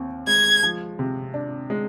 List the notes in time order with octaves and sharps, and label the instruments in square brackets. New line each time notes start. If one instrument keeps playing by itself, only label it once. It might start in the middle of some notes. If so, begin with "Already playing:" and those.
Already playing: [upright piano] D#2 C4
[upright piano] G#3 [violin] G#6
[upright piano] F3
C3
D4
G#3